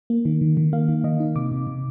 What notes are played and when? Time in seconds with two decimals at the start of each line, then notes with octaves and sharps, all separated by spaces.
0.10 A#3
0.25 D#3
0.41 D#3
0.57 D#3
0.73 A#3 F5
0.88 D#3
1.04 D#3 D#5
1.20 D#4
1.36 C3 D6
1.52 C3
1.67 C3